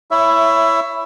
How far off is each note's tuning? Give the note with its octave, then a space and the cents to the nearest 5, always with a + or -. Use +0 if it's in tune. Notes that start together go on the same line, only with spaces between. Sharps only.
E4 +0 C#5 +0 E5 +15